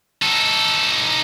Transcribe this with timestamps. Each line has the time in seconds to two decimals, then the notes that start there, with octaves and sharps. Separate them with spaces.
0.22 D#4 A4